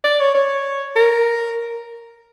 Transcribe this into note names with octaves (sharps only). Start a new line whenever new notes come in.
D5
C#5
C#5
A#4